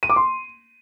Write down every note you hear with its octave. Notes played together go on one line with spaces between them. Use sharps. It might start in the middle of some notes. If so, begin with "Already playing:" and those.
D#7
D6
C6